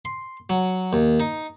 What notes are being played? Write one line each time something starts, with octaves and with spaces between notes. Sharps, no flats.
C6
F#3
D#2
D#4